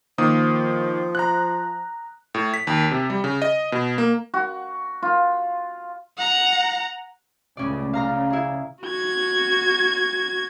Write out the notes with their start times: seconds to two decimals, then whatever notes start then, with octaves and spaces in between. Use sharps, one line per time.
0.18 D#3 F3 A#3 D#6
1.15 A#5 F#6
2.34 A2
2.54 B6
2.67 D#2
2.91 C3
3.10 G3
3.24 C#3
3.42 D#5
3.72 B2
3.98 A#3
4.34 F#4
5.02 F4
6.17 F#5 A#5
7.57 C#2 A2 C#3 C#4 D5
7.93 C#3 F5 A#5 F6
8.30 E4 G#4
8.83 F#4 G#6